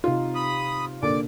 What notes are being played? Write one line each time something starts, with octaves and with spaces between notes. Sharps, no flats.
C3 D#4 F4
B5 D#6
A#2 D3 D5 D6